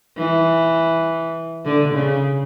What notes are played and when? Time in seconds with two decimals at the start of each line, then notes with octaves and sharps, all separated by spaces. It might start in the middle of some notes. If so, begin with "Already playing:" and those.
0.18 E3
1.65 D3
1.95 C#3